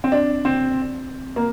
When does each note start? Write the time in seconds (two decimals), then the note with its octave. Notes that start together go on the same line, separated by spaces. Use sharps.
0.04 C4
0.12 D4
0.45 C4
1.36 A#3